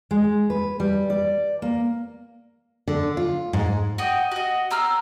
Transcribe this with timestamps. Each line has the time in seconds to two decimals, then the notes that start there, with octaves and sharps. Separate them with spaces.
0.11 G#3
0.50 B4
0.80 G3
1.10 D5
1.62 A#3
2.88 D3
3.17 F4
3.53 G#2
3.98 F#4 D5 D#5 G5
4.31 F#4 D#5
4.71 C4 A#5 E6 F6